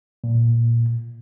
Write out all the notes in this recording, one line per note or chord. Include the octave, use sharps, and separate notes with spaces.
A#2